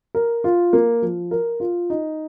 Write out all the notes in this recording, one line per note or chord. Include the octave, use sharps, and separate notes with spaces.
A#4
F4
A#3
F3
A#4
F4
D#4